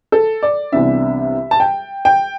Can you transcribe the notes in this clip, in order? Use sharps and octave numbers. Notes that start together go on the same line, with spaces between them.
A4
D5
C2 C3 E3 B3 D4 E5
A5
G5
G5